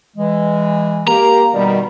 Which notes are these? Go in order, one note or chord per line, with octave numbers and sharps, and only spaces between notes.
E3 G#3
A#3 G4 A#5
B2 D#3 G3